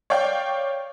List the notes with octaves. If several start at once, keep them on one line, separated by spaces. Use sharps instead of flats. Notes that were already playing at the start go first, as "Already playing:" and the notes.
C#5 D5 F5 G5